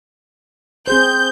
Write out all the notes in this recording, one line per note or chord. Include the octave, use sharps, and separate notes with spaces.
C4 G#4 C5 G6